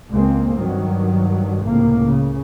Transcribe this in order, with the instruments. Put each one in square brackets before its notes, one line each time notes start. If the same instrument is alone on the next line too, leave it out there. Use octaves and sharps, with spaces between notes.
[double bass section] C#2 G#3 A#3 C4
G2 D#3 F#3
C#2 A2 C3 A#3
C#3